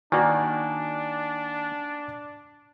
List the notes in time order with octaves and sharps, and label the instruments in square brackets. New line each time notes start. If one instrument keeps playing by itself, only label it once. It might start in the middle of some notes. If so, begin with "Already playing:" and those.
[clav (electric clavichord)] D#3 A#3 [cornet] D4 [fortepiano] F#4 D5 [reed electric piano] G#5